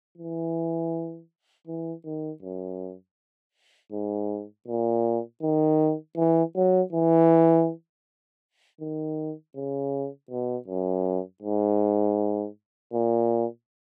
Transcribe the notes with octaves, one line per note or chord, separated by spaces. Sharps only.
E3
E3
D#3
F#2
G#2
A#2
D#3
E3
F#3
E3
D#3
C#3
B2
F#2
G#2
A#2